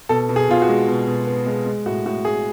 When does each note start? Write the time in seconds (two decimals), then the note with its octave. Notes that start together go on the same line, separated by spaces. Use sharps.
0.09 B2 A4
0.29 B2
0.36 G#4
0.49 B2 F4
0.62 F#4
0.68 G#3
0.88 B2
1.07 B2
1.27 B3
1.46 G#3
1.66 G#3
1.86 A2 F#4
2.06 A2 F#4
2.25 G#3 G#4